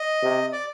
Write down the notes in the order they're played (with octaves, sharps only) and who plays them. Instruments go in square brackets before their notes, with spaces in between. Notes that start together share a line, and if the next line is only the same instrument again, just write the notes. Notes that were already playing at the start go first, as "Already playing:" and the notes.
Already playing: [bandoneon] D#5
[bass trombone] C3
[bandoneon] D5